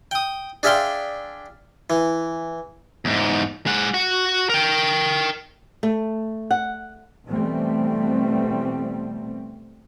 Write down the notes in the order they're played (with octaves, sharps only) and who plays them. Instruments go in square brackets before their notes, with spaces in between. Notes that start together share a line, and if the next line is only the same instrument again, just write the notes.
[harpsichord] G5 D#6
D4 G#4 E5 F5 G5 C6
E3
[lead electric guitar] E2 G#2
G#3 F#5
F#4 F#5
A#4 G5
[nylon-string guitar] A3
F#5
[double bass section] B2 E3 G3 A3 B3 C4